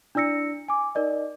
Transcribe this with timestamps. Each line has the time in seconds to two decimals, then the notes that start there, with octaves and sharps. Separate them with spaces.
0.15 D4 E4 D5 E6 A#6 C#7
0.68 G#5 D6
0.95 D#4 A#4 D5 D#5